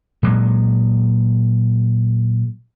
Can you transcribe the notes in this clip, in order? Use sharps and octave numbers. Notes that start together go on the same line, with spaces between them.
A#2 F#3 G#3